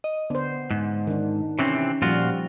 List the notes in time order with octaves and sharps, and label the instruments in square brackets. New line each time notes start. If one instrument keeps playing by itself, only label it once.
[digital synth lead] D#5
[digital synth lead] D3 [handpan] B3 C5
[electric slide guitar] G#2
[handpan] D#3 D4
[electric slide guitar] C3 E3 C4 [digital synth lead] C#4
[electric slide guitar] A#2 F4 F#4 [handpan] F3 G3